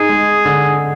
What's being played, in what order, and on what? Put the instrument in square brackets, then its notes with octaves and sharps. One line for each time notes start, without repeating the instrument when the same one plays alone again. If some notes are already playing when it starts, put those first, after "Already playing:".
Already playing: [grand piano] D#4 [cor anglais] G#4
[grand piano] G#3
D3